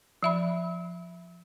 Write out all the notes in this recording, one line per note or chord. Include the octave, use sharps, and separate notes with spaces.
F3 E5 B5